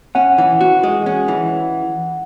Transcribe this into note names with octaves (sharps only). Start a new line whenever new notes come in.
C#4 F#5
E3
F#4
G#3
C#4
E3